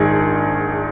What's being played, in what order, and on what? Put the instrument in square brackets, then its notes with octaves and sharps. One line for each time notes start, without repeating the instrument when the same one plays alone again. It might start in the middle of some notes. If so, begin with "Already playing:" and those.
Already playing: [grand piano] A#1 G#2 D#3 G#4